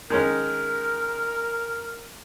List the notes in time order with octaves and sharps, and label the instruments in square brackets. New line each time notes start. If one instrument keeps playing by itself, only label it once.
[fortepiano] D#3 G#3 C#4 [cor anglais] A#4